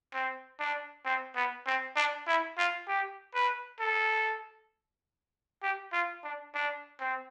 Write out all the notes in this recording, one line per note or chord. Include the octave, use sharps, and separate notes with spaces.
C4
D4
C4
B3
C4
D4
E4
F4
G4
B4
A4
G4
F4
D4
D4
C4